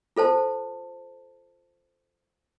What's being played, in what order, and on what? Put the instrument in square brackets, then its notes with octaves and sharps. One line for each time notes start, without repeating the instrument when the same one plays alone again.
[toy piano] F4 A4 C5 A5